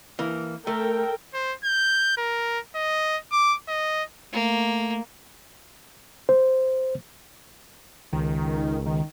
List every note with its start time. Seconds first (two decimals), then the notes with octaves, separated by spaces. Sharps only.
0.19 E3 A#3
0.67 A3 A4 A#4 G5
1.34 C5
1.64 G6
2.17 A#4
2.75 D#5
3.32 D6
3.69 D#5
4.33 A3 A#3
6.29 C5
8.13 C#2 D#3
8.86 D#3